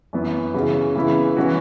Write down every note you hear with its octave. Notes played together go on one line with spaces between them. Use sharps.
F#2 E3 B3
C#3 E3 C#4 F#4
C#3 E3 B3 E4
E3 C#4 F#4